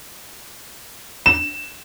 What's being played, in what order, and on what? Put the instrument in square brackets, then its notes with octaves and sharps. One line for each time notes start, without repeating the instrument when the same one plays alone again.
[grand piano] E7